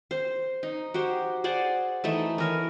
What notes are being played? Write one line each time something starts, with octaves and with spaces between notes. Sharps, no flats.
C5
D#4
F#4 G4 C5
G#4 C5 D5 F#5
E3 A3 D#4
E3 A#4 C#5